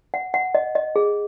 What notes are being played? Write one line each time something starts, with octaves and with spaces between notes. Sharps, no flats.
F#5
F#5
D#5
D#5
G#4